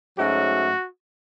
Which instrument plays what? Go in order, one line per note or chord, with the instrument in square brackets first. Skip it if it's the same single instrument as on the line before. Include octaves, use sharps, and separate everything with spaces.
[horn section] G#2 F#3 A3 C#4 F#4